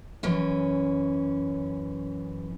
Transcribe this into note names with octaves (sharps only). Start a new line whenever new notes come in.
F#2 E3 C#4